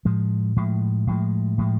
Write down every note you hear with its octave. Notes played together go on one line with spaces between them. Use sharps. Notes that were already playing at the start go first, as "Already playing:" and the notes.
A2 F3 G#3
A2 F3 G#3
A2 F3 G#3
A2 F3 G#3